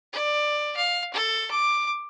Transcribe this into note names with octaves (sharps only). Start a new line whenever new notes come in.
D5
F5
A4
D6